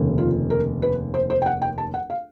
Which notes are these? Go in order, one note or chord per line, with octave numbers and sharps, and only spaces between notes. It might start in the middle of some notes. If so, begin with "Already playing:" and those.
Already playing: F1 D#2 C#3
F4
A#4
B4
C5
C5
G5
F#5
G5
A5
F#5
F5